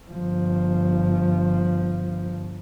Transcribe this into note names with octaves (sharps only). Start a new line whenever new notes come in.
G1 F3